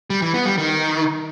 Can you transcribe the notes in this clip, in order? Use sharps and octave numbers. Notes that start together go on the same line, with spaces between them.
G3
E3
B3
G3
D#3